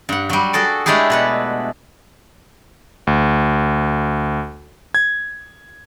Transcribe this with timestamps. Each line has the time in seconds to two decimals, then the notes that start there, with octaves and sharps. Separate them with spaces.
0.09 G2 F#5
0.29 F#3 G3
0.53 F#4 G#4 A4 D5
0.86 G#3 A3 D4 E4 G4 G#4
1.10 B2 B4 F#5
3.07 D2
4.95 G#6